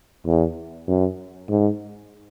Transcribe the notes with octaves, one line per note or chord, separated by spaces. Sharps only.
E2
F#2
G#2